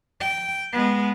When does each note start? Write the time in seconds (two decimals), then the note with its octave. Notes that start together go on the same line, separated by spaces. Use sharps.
0.20 G5
0.73 G#3 B3